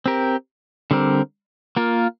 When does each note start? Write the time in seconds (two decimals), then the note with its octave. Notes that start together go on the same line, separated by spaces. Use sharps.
0.06 C4 G4 A#4
0.91 D3 G3 C4 A#4
1.76 A#3 F4 A#4